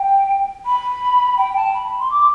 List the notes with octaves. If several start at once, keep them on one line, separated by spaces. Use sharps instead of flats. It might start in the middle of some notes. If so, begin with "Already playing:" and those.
Already playing: G5
B5
G5
A5
B5
B5
C6
D6